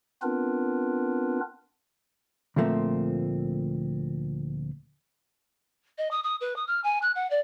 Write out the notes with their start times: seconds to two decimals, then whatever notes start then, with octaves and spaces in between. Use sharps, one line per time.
0.22 B3 C4 D4 F4 A#4 B4
2.56 D2 A#2 F3 A3 A#3 C4
5.98 D#5
6.11 D#6
6.23 D#6
6.41 B4
6.56 D#6
6.67 F6
6.84 G#5
7.02 F#6
7.15 F#5
7.30 D5